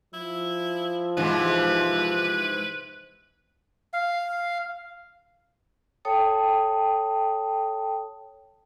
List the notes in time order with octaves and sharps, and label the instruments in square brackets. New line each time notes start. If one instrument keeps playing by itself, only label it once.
[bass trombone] F3 [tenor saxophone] E4
[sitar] G#2 C3 E3 [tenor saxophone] B4
[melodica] F5
[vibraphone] A4 C#5 G5 A5 D#6